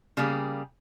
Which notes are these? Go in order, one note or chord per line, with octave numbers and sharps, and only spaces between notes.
C#3 G3 A#3 G4 G#4